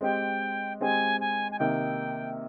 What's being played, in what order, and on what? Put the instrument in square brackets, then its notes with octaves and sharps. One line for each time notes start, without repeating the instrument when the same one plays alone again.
[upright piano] G#3 C4 G4 [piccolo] G5
[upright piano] G#3 C4 G4 [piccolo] G#5
[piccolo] G#5
G#5
[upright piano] C3 D#3 A#3 D#4 [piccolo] G5